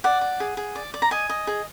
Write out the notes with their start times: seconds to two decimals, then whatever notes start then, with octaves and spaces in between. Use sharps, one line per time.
0.04 D5 F#5
0.21 D5
0.40 G#4
0.57 G#4
0.75 D5
0.94 D5
1.02 A#5
1.11 D#5 G#5
1.29 D#5
1.47 G#4